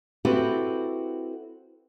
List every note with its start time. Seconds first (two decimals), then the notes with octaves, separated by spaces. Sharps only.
0.25 C4 E4 F#4 G4 A4 B4